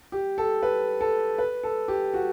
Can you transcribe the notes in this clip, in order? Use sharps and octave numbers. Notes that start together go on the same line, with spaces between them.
G4
A4
B4
A4
B4
A4
G4
F#4